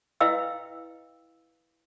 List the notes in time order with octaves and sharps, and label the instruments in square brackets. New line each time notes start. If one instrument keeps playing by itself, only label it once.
[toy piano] E4 B4 D#5 F5 G5 E6